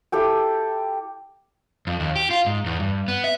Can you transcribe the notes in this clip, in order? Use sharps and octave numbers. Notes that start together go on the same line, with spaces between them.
E4 G4 A4 G5
F2
D#2
G4
F4
G#2
E2
G2
B3
E5